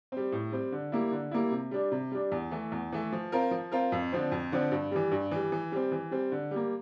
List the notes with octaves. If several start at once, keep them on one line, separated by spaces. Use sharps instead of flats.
G3 C4
A2
G3 C4
D3
G3 A#3 E4
D3
G3 A#3 E4
C3
G3 D4
C3
G3 D4
E2
E3 A3
E2
E3 A3
F3
C4 F4 A#4
F3
C4 F4 A#4
F2
D3 F3 C4
F2
D3 F3 C4
G2
E3 G3
G2
E3 G3
E3
G3 C4
E3
G3 C4
D3
G3
A#3